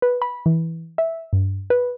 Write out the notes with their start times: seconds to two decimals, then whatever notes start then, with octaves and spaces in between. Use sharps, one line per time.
0.02 B4
0.22 B5
0.46 E3
0.98 E5
1.33 G2
1.70 B4